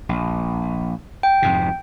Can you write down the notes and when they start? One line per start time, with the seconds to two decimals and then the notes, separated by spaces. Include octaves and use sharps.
0.09 A#1
1.23 G5
1.42 F2 G#2 C3